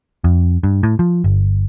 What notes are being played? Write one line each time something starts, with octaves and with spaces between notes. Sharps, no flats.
F2
G2
A2
F3
G1